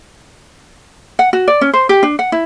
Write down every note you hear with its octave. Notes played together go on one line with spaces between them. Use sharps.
F#5
F#4
D5
C#4
C5
G4
D4
F#5
E4